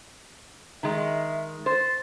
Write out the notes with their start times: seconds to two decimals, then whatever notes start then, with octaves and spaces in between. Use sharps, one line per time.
0.83 D#3 G#3 E5
1.66 C5 A6